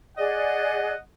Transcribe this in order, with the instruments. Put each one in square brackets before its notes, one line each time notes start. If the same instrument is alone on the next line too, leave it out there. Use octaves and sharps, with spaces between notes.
[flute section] G#4 D5 [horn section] D#5 F#5